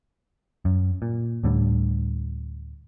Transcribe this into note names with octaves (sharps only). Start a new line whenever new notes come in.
F#2
A#2
D2 A2 D3 G3